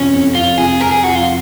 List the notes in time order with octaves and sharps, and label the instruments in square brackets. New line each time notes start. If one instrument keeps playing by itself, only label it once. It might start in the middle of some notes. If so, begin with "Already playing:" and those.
Already playing: [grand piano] F2 C3 F3 [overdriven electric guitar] C#4
[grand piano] F2
[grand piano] F2 [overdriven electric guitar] F4
[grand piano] C3 [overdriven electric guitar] G#4
[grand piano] F2 [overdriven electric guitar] A#4
[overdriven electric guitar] G#4
[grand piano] F3 [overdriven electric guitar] F#4
[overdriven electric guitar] F4